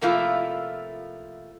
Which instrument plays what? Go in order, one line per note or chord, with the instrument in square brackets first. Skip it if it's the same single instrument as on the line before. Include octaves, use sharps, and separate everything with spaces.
[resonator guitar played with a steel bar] C3 F3 A3 A#3 E4 F4